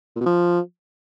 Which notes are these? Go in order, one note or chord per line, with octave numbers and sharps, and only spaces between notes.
A#2
B2
F3